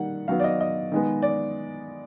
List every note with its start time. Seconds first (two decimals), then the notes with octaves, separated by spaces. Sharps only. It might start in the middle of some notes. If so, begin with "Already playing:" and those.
Already playing: D#3 G3 A#3 F#5
0.28 D#3 F#3 B3 F5
0.40 D5
0.44 D#5
0.61 D#5
0.92 D#3 G#3 B3
1.22 D5